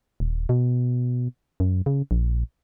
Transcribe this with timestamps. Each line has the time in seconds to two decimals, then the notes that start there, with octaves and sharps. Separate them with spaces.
0.20 D#1
0.49 B2
1.60 F#2
1.86 C#3
2.11 A#1